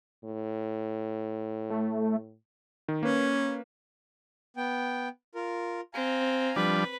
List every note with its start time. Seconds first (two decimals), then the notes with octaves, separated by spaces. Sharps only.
0.25 A2
1.70 A3
2.88 D#3
3.03 A#3 C#4 B4
4.57 B3 G5
5.35 F4 A#4
5.94 C4 F5 G#5 A#5
6.56 F3 G3 D4 B4